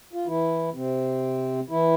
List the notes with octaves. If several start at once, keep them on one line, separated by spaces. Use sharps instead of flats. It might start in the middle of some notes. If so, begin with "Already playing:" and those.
F4
E3 E4
C3 C4
E3 E4